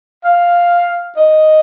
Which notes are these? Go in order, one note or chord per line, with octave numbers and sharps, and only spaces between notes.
F5
D#5